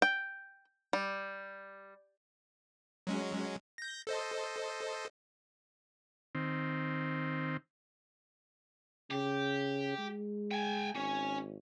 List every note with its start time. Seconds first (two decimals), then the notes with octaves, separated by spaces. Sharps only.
0.02 G5
0.93 G3
3.07 F#3 G#3 C#4
3.78 G6 A#6
4.07 A4 C5 D#5
6.35 D#3 C4
9.11 C#3 G4
9.98 G#3
10.51 G5 G#5
10.95 G#1 C#4